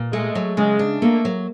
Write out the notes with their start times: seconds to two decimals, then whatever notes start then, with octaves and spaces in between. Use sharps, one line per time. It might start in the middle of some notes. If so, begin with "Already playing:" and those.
Already playing: A#2
0.13 G#3 A3
0.35 F#3
0.57 C#3 G#3
0.79 D4
1.02 A3 A#3
1.25 F#3